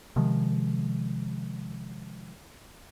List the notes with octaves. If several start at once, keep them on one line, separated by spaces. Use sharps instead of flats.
C3 D#3 F3 G#3